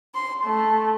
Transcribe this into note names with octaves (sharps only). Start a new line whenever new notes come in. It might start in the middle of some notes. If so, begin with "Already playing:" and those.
C6
A3